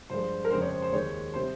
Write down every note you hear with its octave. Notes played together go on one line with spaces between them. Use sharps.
G2 F3 G#3 C5
A#4
F2 C#3 G#3 C5
C#5
C5
C5
D#2 D#3 G#3 C#5
C3 G3 C5